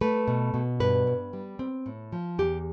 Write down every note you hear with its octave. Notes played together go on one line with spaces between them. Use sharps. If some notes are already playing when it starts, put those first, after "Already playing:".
A3 B4
B2
B2
G2 B4
G2
G3
C4
A2
F3
E2 G4